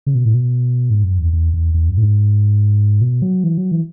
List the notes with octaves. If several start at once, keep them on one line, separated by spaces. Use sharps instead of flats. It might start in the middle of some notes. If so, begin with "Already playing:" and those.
C#3
B2
A2
B2
G#2
F#2
E2
E2
E2
E2
F#2
A2
G#2
B2
F#3
E3
F#3
E3